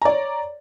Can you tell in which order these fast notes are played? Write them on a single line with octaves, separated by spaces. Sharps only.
A#5 D5 C#5